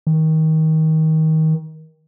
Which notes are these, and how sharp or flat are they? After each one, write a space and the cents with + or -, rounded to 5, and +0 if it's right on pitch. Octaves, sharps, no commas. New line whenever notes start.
D#3 +25